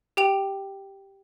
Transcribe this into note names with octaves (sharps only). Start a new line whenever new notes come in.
G4 G5 F7